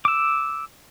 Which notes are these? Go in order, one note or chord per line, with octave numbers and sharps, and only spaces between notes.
D6 E6